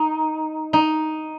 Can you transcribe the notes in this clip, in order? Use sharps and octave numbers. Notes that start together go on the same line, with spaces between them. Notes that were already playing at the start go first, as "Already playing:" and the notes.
Already playing: D#4
D#4